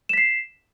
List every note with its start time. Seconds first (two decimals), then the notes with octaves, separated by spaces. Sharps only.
0.09 E7
0.13 B6
0.17 C7